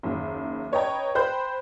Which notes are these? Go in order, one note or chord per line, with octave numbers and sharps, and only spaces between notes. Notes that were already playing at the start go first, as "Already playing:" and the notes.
F#1 D#2
B4 C#5 D#5 G5 A#5
C5 G5 B5 F#6 G6